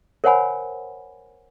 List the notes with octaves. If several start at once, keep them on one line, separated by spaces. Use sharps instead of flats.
A#4 C5 C#5 F#5 G#5 B5